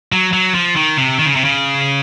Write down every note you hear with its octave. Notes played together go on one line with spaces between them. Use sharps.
F#3
F#3
F3
D#3
C3
D#3
C#3
C3
C#3